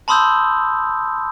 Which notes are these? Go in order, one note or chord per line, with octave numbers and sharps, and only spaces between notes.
A5 B5 C6 D#6 E6 G6